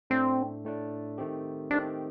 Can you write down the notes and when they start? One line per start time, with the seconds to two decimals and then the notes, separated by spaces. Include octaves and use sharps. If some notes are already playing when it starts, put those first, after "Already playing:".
0.10 A2 A3 C4 D4
0.64 A2 A3 D4
1.18 D#3 A3 C4 G4
1.71 D#3 A3 C4 D4 G4